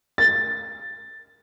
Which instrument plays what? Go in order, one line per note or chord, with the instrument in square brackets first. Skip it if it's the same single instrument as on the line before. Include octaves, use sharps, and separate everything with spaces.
[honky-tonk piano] A6